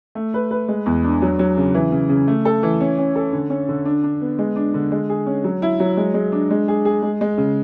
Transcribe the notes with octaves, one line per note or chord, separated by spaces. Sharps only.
A3
B4
B4
G#3
E2
D4
F#3
F#3
C#3
E3
C#3
C#3
A3
A4
E3
C#4
C#4
A4
D3
C#4
D3
D4
D4
B3
G#3
D4
D3
G#3
G#4
C#4
F#3
E4
F#3
G#3
G#3
D4
G#3
G#4
G#4
G#3
G#3
C#3